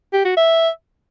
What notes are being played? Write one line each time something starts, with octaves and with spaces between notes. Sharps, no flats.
G4
F#4
E5